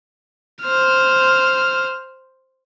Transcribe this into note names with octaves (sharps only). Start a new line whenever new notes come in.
C5 F6